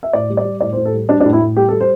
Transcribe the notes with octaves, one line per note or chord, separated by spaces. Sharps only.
E5
A2 D5
G3
D5
G3
A2 D5
C5
A2
A4
G3
G3 D4
D4
A2
E4
A2
G3 G4
A4
G3
C5